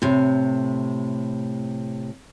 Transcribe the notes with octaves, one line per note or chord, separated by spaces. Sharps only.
A2 C3